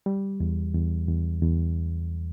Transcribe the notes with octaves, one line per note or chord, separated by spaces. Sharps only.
G3
E2
E2
E2
E2